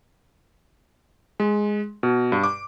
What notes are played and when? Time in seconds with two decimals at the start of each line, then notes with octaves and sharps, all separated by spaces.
1.40 G#3
2.03 B2
2.32 G2
2.44 D6